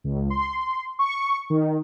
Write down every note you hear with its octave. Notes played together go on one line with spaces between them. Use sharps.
C#2
C6
C#6
D#3